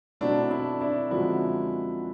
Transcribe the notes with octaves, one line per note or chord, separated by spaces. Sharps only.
B2 F#3 A3 C4 D4 E4
D4 E4
D4 E4
F#2 D3 F3 G#3 C4 E4 F#4